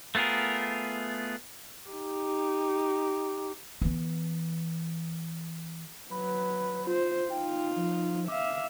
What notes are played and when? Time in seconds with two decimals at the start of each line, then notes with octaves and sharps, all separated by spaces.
0.15 A3 B3 F4 G#4 A#4
1.90 D#4 G4
3.82 E3 B3
6.11 F#3 B4 B5
6.87 F4 C5
7.30 D#4 F4 G5
7.76 F3
8.28 E5 F5 D6